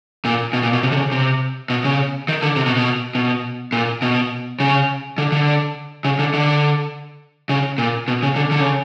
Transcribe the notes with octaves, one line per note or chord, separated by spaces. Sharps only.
A#2
B2
A#2
B2
C3
D3
C#3
C3
B2
C#3
D#3
D3
C3
B2
B2
B2
A#2
B2
C#3
D3
D3
C#3
D3
D3
C#3
A#2
B2
C#3
D3
D3
C#3